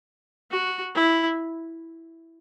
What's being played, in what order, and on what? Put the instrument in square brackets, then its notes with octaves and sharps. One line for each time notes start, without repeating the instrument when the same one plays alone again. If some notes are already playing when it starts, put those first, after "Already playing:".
[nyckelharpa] F#4
E4